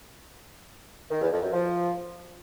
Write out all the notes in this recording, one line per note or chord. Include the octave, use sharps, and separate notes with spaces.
D#3
E2
F2
F#2
F3